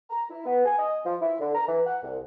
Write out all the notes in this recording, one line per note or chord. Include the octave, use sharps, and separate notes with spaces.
A#5
E4
B3
G#5
D#5
F3
E4
D3
A#5
E3
F#5
C2